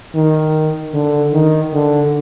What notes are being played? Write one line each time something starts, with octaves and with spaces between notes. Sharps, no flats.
D#3
D3
D#3
D3